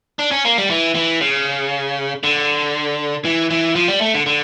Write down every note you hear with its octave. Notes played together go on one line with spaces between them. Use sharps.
D4
C#4
A#3
G3
E3
E3
C#3
D3
E3
E3
F3
G3
A3
D3
D3